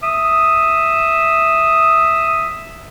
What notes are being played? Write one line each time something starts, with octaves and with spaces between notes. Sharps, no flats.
E5 D#6